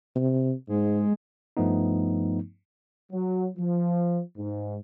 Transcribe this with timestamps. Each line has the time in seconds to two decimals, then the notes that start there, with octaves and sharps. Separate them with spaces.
0.15 C3
0.69 G#2 G#3
1.57 G2 F3 A3 B3 D#4
3.11 F#3
3.56 F3
4.37 G#2